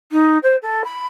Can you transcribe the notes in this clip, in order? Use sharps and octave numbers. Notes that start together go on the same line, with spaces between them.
D#4
C5
A4
B5